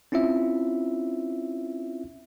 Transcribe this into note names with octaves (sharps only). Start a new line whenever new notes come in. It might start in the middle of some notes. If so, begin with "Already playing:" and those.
C4 C#4 E4 F4 E5